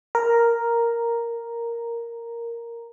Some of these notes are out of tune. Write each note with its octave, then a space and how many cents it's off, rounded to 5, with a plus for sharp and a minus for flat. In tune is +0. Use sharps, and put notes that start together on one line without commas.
A#4 +0 A#5 +0